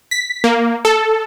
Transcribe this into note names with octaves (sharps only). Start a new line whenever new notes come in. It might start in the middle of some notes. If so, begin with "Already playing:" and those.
B6
A#3
A4